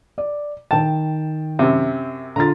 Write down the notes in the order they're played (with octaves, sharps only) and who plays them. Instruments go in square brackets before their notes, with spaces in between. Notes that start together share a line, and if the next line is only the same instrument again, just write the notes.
[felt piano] D5
[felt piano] D#3 G5 [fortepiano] A5
[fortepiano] F#2 C3
[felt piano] D3 F4 A6 [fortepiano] A#5